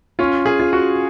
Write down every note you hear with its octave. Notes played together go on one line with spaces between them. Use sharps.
C#4 F4
F4 G#4
F4
F#4